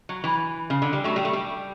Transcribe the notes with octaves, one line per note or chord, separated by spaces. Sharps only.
F#3
E3
C#3
D3
G3
F#3 A3
G3
A3
G3